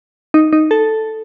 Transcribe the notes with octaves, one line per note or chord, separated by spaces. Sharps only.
D#4
D#4
A4